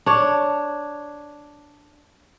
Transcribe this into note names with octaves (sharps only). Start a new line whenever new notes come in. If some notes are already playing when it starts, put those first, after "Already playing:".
D4 C#5